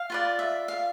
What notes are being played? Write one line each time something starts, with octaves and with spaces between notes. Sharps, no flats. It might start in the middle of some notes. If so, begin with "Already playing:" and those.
Already playing: F5
F4 B4 D5
E5
F5